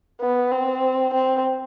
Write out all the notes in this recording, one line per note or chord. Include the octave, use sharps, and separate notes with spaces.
B3
C4
C4